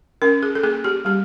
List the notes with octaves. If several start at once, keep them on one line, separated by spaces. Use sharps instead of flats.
C#4 A#4
G#4
A4
A#3 G#4
G4
G3 G4